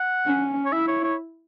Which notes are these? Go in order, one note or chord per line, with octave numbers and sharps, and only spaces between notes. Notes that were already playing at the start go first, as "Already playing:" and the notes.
Already playing: F#5
C#4
C#5
E4 E5
C#5
C#5